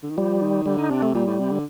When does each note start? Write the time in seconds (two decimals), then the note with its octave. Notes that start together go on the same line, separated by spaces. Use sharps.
0.03 D3
0.10 D#3
0.17 F3 G3
0.42 D#3
0.66 D3 G3
0.79 D#4
0.90 C3 D4
1.02 A3
1.15 A#2 G3
1.27 A2
1.39 C3
1.52 D3